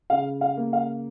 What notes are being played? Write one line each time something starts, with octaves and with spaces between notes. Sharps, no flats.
C#3 F5
F5
A#3
F5